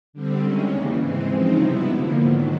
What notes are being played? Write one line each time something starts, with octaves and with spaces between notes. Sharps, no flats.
D3 G3 C4
D#3 G#3 C#4 E4
E2 C#3 E3 G3 A#3
G#2 E3 G#3 C4
C#3 F3 G#3 C4 D#4
C3 E3 G3 B3 E4
F2 D3 F3 A#3
G#2 D#3 F#3 B3